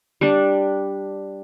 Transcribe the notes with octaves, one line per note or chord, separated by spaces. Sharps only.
G3 D4